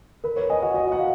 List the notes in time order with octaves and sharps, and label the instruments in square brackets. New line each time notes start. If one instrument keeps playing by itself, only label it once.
[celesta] A#4 [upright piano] B4
[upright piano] C#5
[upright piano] D#5 [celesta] G#5
[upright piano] F#4
[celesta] F#4 [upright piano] D#5
[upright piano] F#5
[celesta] F5